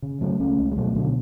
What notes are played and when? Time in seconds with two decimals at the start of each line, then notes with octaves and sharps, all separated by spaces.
0.02 C#3
0.21 C#3 F#3 A3
0.40 C#2 A3 C#4
0.59 C#2
0.72 G#3
0.77 B2 F#3 A3
0.95 B2 D3 F#3